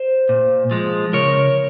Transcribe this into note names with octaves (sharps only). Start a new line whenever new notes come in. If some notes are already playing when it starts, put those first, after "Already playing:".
Already playing: C5
A#2
F3 G#3
C#3 A#4 C#5